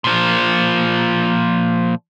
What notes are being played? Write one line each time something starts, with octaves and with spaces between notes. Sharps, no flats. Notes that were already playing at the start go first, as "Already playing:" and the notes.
A#2 F3